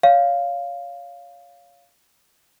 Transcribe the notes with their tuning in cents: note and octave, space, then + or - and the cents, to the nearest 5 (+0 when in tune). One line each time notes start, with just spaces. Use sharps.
C#5 +30 F5 +0